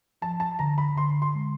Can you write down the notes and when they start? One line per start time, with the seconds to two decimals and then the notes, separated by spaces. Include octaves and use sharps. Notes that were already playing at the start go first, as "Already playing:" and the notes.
0.22 F3 A5
0.40 A5
0.59 D3 A#5
0.78 B5
0.96 D3 C6
1.22 C6
1.35 G#3